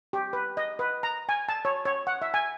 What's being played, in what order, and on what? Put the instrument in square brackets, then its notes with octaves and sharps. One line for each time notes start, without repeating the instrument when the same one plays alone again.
[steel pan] G4
B4
D#5
B4
A#5
G#5
A5
C#5
C#5
F#5
E5
G#5